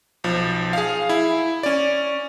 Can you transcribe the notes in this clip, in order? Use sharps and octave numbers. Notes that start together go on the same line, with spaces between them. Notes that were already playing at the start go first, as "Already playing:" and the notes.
B1 F3
G#4 F5
E4
C#4 D5